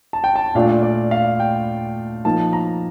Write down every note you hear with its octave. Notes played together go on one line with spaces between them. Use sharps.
A5
G5
A5
A#2 A3 D4 F4 F5
D5
F5
G5
F3 A#3 D#4 A5
A#5